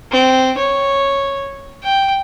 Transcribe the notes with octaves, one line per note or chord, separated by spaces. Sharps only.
C4
C#5
G5